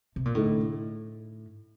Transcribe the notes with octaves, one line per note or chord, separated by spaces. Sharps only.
C3
A#2
D2 A2 D3 A3 D#4